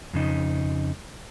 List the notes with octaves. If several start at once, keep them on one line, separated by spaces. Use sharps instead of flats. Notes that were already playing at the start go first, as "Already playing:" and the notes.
F2 C#3 D#4